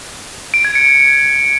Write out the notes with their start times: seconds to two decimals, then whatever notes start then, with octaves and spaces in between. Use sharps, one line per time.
0.54 D7
0.65 G#6
0.75 C#7